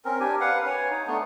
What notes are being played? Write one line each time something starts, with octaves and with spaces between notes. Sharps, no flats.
C4 C#4 A#4
D4 G4 G#5
B4 F5 F#5
C#5 G#5
D#4
A3 B3 D4